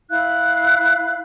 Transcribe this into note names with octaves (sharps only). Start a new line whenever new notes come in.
E4 F5 F#6